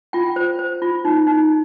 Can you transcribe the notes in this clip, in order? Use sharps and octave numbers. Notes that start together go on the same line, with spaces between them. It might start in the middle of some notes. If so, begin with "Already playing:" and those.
F4 G5
C5
C5
F4
D#4
D#4